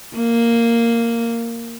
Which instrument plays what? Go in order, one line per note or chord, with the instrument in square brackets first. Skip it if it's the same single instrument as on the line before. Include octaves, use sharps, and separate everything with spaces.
[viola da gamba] A#3